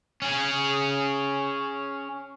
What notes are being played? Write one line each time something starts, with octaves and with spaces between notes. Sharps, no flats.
C#4 G#4